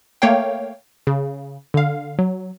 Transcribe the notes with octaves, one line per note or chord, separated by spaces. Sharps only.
A3 A#3 C#5 F5 G5
C#3
D3 F5
F#3